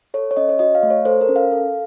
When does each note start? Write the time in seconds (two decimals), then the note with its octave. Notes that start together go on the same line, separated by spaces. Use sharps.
0.14 A4 C#5
0.31 C#5
0.37 C#4 D#5
0.49 C#5
0.59 F#4 D#5
0.75 F5
0.83 A3
0.90 C#5
1.05 A4 C5
1.21 A#4
1.29 C#4
1.36 F5
1.52 A4